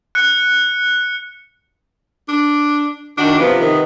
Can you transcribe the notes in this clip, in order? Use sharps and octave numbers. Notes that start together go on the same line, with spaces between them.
F#6 C#7
D4
F#2 D#3 D4 F#4
C3 F3 B3
D#3